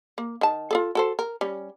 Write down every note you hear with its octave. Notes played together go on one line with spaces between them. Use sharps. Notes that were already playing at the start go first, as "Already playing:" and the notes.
A#3
D#3 A5
F4 G#4 A4
F#4 A4 C5
A#4
G3 C#4